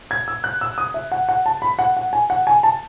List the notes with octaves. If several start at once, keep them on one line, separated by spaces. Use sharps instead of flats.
G#6
E6
F#6
E6
D#6
E5
F#5
F#5
A5
B5
F#5
F#5
G#5
F#5
G#5
A5